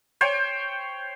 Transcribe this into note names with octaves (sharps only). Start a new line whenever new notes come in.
C5 C#5 G5